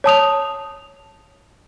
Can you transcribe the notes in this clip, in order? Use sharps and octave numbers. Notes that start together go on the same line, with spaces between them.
C#5 A5 D#6 F7